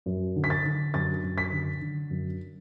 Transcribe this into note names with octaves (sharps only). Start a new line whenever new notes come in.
F#2
D3
B6
A6
D3
F#2 A6
F#2
B6
D3
D3
F#2